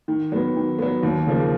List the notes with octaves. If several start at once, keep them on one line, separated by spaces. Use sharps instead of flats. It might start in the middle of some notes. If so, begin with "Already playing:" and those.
D#3
F#3 B3
D#3
F#3 B3
D#2
C#3 F3 A#3